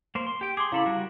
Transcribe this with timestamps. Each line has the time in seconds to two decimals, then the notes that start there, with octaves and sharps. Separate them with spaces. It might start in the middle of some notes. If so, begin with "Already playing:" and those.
0.15 A#3 C5
0.27 C6
0.41 G4 G5
0.57 G#4 C6 D6
0.72 C#3 E4 A4 F5 B5
0.86 G3 F#4 A#4